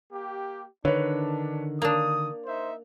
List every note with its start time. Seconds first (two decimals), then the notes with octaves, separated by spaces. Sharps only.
0.12 A#3 G4
0.85 D3 D#3 D4 B4 C#5
1.82 A#3 D4 D#6 F7
2.46 D#4 C5 E5